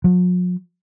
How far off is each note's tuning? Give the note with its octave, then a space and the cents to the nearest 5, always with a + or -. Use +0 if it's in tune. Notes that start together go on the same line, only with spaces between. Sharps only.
F#3 -45